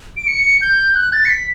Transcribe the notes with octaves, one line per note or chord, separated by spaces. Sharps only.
D7
C#7
G6
F#6
A6
C#7
B6